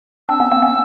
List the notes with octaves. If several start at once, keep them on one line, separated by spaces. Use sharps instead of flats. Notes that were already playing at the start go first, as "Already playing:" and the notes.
C4 D4 E6
B3 C#4
A#3 C4
B3 C#4